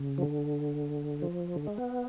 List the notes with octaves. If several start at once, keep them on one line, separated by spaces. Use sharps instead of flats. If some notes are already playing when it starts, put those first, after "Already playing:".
Already playing: C#3
F3
D3
F3
D3
G#3
B3